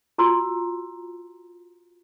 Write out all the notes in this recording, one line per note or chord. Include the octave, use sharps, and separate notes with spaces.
F4 F#4 A#5 C6 E6